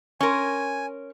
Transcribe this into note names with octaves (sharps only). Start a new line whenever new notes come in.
C#4 A#4 G#5 C6 C#6